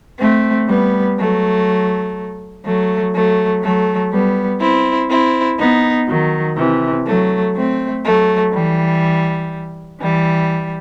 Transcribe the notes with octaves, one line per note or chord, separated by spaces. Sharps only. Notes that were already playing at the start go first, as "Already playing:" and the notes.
A3 C4
G3 B3
F#3 A3
F#3 A3
F#3 A3
F#3 A3
G3 B3
C4 E4
C4 E4
B3 D#4
D#3 F#3
C3 E3
F#3 A3
A3 C4
F#3 A3
E3 G3
E3 G3